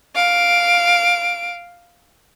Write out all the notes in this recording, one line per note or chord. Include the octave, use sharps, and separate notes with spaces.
F5 D7